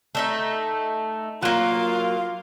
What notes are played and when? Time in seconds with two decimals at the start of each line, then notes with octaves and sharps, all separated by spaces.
0.15 A3 D#4 E5
1.43 F#3 A#3 F4